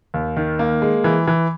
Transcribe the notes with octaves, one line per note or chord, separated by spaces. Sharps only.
D#2
D#3
A#3
G#3
E3
E3